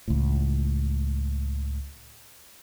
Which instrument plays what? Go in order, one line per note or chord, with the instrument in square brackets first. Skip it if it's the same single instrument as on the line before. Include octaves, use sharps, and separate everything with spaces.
[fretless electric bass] C#2 A2